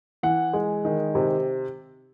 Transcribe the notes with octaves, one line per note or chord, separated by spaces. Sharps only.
E3 F#5
G#3
D#3
C3